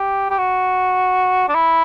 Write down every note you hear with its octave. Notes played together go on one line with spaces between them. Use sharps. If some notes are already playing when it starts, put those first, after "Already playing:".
Already playing: G4
G4
F#4
D4
E4